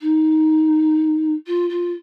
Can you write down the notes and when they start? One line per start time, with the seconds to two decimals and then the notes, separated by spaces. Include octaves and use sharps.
0.01 D#4
1.46 F4
1.69 F4